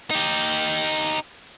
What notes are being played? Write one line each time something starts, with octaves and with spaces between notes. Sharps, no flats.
D#4 G4